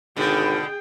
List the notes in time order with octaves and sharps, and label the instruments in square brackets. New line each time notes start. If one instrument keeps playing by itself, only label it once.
[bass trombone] G#1 [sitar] B2 D3 [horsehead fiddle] G#4 G5